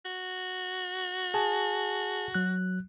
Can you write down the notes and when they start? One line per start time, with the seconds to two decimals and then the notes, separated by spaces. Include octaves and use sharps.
0.05 F#4
1.34 G#4 G#5 A5
2.34 F#3 F#6